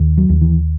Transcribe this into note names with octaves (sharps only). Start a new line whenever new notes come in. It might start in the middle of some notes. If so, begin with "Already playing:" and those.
Already playing: D#2
F#3
D#2
E3